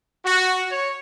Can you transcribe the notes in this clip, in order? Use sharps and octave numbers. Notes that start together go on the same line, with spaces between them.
F#4
C#5